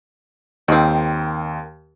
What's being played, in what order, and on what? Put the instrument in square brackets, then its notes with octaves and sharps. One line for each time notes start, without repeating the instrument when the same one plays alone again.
[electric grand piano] D#2 [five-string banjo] D#3 C4